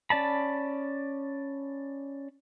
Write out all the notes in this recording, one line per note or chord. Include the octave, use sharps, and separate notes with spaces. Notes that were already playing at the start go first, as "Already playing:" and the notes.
C#4 D5 A5 B5